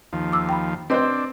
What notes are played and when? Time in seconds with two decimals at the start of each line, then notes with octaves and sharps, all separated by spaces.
0.13 D#2 F3
0.33 D6 E6
0.49 G5 A#5 B5
0.90 C4 D4 B4 C5 D#5 C6